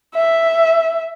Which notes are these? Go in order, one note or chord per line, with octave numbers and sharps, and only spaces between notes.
E5